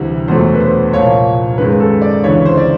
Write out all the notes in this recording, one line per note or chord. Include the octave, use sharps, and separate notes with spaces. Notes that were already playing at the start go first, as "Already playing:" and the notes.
Already playing: D2 C3 E3 G3
E2 B2 F#3 A3 C5
B4
C5
C2 A#2 F3 A#3 C#5
F#2 D#3 G#3 B4
A4
D5
D2 C#3 E3 C#5
C5
D5